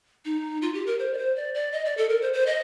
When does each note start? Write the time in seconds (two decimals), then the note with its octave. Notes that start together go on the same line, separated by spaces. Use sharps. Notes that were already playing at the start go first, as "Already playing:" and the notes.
0.25 D#4
0.62 F4
0.74 G4
0.86 A#4
0.99 C5
1.14 D5
1.18 C5
1.36 D5
1.54 D5
1.72 D#5
1.85 D5
1.97 A4
2.09 A#4
2.22 C5
2.33 C5
2.46 D#5